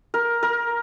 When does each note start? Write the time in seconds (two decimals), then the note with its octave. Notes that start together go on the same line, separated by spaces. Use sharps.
0.14 A#4
0.43 A#4